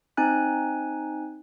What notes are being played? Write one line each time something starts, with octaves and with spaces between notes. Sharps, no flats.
C4 D#4 G#5 F#6